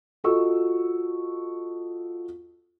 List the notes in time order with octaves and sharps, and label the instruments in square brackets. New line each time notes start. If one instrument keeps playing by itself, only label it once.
[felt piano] F4 F#4 A4 D#5 C#6 E6